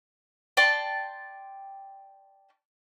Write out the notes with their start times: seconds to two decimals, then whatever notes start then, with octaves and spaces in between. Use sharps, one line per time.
0.57 D5 G5 A5 C6